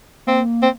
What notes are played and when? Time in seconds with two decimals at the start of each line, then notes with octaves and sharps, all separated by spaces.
0.27 A#3 C4
0.63 C4